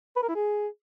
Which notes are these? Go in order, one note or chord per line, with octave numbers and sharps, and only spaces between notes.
B4
A#4
E4
G#4